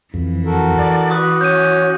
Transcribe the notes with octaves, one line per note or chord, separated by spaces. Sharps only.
F2 E3
F#4 A4 A#4
D5
F#4 B4 D6 D#6 F#6
C#4 C#5 G6 D#7